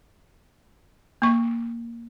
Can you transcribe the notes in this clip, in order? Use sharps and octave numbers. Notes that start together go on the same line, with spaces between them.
A#3 C#6